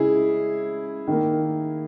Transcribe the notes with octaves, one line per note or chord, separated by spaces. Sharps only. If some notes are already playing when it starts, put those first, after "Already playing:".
Already playing: C#3 G#3 E4 G#4
D#3 A#3